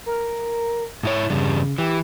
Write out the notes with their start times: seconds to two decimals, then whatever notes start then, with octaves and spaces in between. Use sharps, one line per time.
0.06 A#4
1.03 G#2 E4 C#5
1.30 E2 G2 C#3 G3
1.78 E3 G4